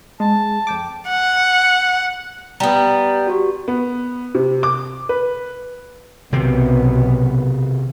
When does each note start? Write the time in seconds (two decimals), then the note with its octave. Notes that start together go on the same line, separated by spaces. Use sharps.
0.20 G#3 A5
0.67 F2 G5 D6
1.08 F#5
2.60 G3 B3 A#5
3.27 F#4 G4
3.68 B3
4.35 C3
4.63 D6
5.09 B4
6.32 B1 C3 D#3 B3 C4